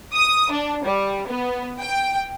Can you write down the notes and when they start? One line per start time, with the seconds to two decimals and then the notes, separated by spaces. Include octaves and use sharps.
0.14 D#6
0.52 D4
0.84 G3
1.27 B3
1.79 G5